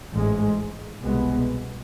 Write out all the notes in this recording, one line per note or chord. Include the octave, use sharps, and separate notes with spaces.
A1 G#2 G#3
C2 B2 G#3 B3